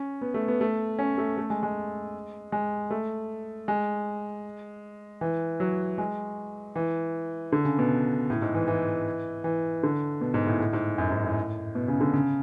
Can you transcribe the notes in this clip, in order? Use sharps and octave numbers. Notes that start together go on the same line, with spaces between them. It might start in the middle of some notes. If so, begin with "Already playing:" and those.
Already playing: C#4
B3
A3
B3
A3
C#4
A3
A3
G#3
G#3
G#3
A3
G#3
E3
F#3
G#3
E3
D3
C#3
B2
A2
G#2
E3
E3
E3
D3
B2
G#2
A2
A2
G#2
F#2
G#2
A2
B2
C#3
D3
C#3